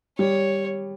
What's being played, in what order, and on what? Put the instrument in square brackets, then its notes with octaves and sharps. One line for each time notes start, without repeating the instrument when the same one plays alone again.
[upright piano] G3 [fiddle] C#5